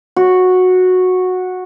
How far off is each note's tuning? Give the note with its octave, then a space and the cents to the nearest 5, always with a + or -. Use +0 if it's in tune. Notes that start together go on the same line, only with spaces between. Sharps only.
F#4 -10